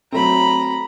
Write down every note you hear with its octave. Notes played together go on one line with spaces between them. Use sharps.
F#3 A3 C4 A#5 B5